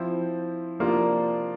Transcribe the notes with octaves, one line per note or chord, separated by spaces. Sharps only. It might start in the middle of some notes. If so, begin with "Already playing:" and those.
Already playing: F3 C4 E4
C3 F3 A#3 D4 F4